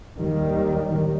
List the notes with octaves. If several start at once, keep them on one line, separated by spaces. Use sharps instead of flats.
D#2 D#3 G3